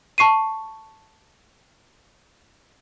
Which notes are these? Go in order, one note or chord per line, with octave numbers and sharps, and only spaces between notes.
A5 C#6 C7 D#7